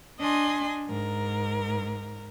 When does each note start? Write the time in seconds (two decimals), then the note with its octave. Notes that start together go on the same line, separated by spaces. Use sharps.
0.19 D4 D#5 G#5 C6
0.88 G#2 A#4